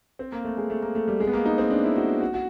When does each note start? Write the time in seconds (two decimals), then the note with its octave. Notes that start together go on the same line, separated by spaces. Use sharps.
0.19 C4
0.32 A#3
0.44 A3
0.57 G#3
0.70 A3
0.82 A#3
0.95 A3
1.08 G3
1.20 G#3
1.27 B3
1.33 A#3
1.45 D#4
1.58 C4
1.70 D4
1.84 E4
1.96 F#4
2.21 F#4
2.34 F#4